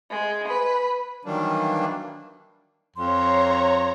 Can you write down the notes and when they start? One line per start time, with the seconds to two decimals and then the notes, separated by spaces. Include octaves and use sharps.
0.11 G#3
0.49 B4
1.25 D#3 E3 F#3 G3 A#3 D4
2.96 F2 C#5 A#5 C6